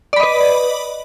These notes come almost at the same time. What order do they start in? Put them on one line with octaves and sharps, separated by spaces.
D5 B5 D#5 B4